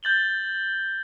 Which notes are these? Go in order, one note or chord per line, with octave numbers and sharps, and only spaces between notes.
G6 A6 F#7 G7